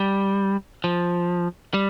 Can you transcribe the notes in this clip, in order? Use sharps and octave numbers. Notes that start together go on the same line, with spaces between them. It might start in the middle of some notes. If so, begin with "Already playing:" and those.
Already playing: G3
F3
G3